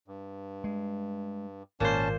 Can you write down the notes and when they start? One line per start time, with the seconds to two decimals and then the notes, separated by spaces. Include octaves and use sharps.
0.08 G2
0.64 G#3
1.80 G#1 A#2 A#3 C#4 C5 A5